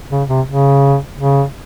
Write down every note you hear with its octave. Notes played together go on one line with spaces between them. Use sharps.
C#3
C3
C#3
C#3